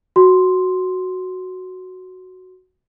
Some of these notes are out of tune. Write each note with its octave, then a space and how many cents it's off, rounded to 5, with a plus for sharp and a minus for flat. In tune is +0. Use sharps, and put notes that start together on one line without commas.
F#4 +0 C6 +0